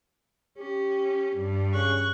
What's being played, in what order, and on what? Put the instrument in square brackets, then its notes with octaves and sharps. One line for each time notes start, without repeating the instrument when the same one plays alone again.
[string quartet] C#4 [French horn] G4
[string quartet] G2
[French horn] C#3 [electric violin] C#6 F#6